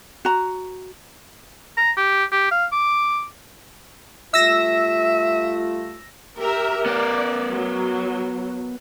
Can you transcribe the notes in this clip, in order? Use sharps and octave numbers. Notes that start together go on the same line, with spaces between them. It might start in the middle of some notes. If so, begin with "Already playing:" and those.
F#4 A#5
A#5
G4
G4
F5
D6
G3 A3 F4 E5 E6 A#6
G4 A#4 E5
B3 A#4 D5
F#3